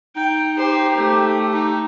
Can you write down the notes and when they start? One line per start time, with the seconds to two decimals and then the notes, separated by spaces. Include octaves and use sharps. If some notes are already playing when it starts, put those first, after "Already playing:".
0.16 D#4 G5
0.58 G4 C5
0.97 A3
1.54 D#4